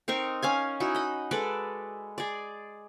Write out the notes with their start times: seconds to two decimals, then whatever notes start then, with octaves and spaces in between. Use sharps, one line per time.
0.08 C4 D#4 A#4 C#6
0.42 C#4 F5 G#5
0.80 D#4 E4 F#4
0.95 D#5 B5
1.31 G#3 A4 B4 D5
2.18 G#4 D5